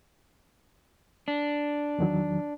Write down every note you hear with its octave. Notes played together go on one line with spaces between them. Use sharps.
D4
E2 D#3 F#3